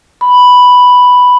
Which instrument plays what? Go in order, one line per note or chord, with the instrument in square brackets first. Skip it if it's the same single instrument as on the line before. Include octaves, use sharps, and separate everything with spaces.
[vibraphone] B5